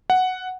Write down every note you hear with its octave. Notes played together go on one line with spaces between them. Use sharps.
F#5